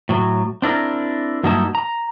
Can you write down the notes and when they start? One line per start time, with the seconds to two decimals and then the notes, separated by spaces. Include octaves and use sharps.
0.09 A2 F#3
0.62 C4 D4 E4 A#4
1.43 G2 F#3 A#3 D#4 E4 A5
1.75 A#5